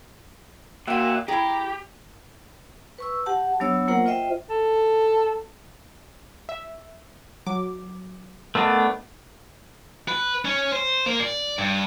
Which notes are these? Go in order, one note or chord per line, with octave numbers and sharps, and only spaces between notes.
A#2 F#4 E5 F5 G5
E4 G4 G#4 A#5
B4 C#6 E6
G4 F#5 A5
F#3 B3 D4 C#5 E6
A#3 F4 A#4 C5 F#5 A#5
F4 C5 D#5 E5 G5
A4
E5
F#3 D6
A3 B3 D4 A#4 D#5 F5
B4
C#4
C5
A#3
D5
G2